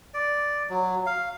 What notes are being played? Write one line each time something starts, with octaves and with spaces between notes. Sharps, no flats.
D5
F#3
F5